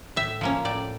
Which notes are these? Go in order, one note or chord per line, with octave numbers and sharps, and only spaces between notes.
A2 E5
F3 A#3 C#4
A2 D5